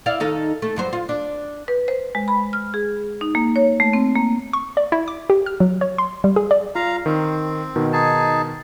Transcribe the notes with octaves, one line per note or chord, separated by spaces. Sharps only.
E4 D5 F5
D#3 D#4 A4
A3
G2 F#3 C5
F4
D4
B4
C5
G#3
B5
F6
G#4
D#4
A#3
C#5
A3
C4
A#3
C#6
D5
E4
D6
G4
F6
F#3
C#5
C6
G3
G#4
D5
F4 F5 A#5
D#3 C4
B2 D#3
D#4 G#4 A5